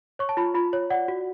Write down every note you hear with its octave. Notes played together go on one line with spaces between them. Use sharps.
C#5 C#6
A5
F4 B5
F4 B5
C#5
D5 F#5
F#4